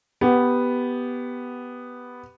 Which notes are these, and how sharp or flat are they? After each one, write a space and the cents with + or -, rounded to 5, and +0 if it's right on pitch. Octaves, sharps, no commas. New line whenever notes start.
B3 +0 G4 +0